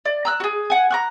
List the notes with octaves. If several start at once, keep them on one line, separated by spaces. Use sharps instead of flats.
D5
A#5 E6 F#6
F#4 G#4
F#5 G#5
A#5 C#6 F#6